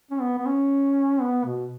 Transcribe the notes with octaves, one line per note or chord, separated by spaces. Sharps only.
C#4
B3
B3
C#4
B3
B2